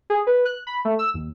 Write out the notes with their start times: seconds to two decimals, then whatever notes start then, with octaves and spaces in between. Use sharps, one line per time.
0.10 G#4
0.27 B4
0.45 F#6
0.67 B5
0.85 A3
0.99 E6
1.14 D#2